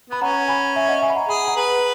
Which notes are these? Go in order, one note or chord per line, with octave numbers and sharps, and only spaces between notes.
B3 B5
C#4 F#5 A#5
G#5 B5
E5 G#5
D#5 F#5
E5 G#5
B5
F#5 A#5
G#4 G#5 B5
F#5 A#5
B4